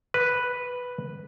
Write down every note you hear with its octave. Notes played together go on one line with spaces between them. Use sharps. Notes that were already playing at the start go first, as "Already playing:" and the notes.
B4